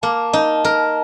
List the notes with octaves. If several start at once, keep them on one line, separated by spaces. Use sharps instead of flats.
A#3 A5
D#4
A#4